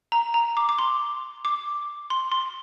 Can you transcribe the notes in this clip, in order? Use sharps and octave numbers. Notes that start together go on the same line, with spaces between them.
A#5
A#5
D6
D6
C6
D6
C6
C6